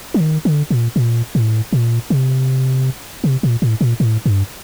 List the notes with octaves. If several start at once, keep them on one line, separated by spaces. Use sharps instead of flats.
F3
D#3
D3
A#2
A#2
A2
A#2
C3
C3
A#2
A2
A#2
A2
G2